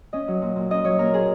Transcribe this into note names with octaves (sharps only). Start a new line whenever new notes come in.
C#4 D#5
F#3
A#2
A#2
C#4 D#5
F#3 C#5
A#2 A#4
A#2 G#4